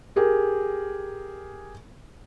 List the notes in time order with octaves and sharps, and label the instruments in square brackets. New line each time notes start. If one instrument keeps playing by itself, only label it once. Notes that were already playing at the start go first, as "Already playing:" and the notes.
[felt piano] G4 G#4 A#4